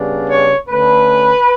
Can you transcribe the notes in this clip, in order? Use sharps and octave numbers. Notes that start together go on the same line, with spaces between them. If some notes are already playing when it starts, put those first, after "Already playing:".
Already playing: C#3 G3 B3 D4
C#5
D3 A3 C#4 B4